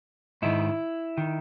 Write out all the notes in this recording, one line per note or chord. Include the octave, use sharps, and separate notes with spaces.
G#2 D#3 E4
D#3